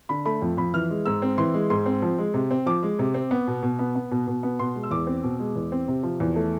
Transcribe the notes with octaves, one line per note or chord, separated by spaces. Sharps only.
D3 B5
A3 B5
F2
F2 B5
E3 F6
G#3
G#2 E6
C4
E3 C6
G#3
G#2 C6
C4
F3
G#3
C3
C4
F3 D6
G#3
C3
C4
B3
B2
B2
B3
B3
B2
B2
B3
B2 C6
G#3
E6
E2 D6
C4
B2
G#3
E2
C4
C3
F3
E2
A3